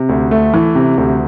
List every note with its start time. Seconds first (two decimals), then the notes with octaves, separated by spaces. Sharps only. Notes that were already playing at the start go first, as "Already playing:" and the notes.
Already playing: C3
0.09 D2
0.31 A3
0.54 E3
0.75 C3
0.98 D2